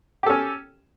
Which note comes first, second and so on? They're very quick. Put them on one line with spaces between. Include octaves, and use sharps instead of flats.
G4 A4 C#4